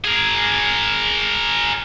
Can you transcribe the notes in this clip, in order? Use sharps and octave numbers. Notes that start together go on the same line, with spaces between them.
G#4 A#4